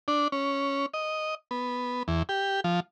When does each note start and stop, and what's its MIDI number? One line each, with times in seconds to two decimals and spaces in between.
0.08 0.28 62
0.32 0.86 61
0.94 1.35 75
1.51 2.03 59
2.08 2.23 40
2.29 2.60 67
2.64 2.80 53